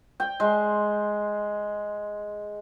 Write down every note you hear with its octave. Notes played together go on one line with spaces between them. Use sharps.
G5
G#3